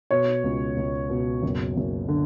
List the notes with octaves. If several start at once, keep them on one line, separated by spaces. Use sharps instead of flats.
B2 C#5
C#2
C#2
B2
F#1
F#1
D3